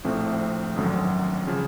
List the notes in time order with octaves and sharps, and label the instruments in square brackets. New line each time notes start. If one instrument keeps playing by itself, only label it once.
[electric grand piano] A#1 A2 F3 A3 C4
G#1 F#2 D3 F#3
C#3 F3